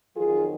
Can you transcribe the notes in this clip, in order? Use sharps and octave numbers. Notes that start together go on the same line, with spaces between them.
F2 D#3 F#3 F4 G#4